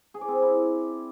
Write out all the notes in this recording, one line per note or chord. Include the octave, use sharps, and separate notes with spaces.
G#4
D5
C4
G#4
E4